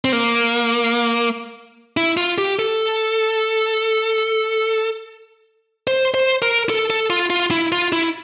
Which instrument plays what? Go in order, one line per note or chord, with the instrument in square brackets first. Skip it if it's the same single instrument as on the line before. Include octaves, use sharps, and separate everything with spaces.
[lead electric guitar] C4
A#3
E4
F4
G4
A4
C5
C5
A#4
A4
A4
F4
F4
E4
F4
E4